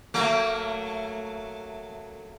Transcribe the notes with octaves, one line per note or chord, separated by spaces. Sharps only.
F#3 A3 A#3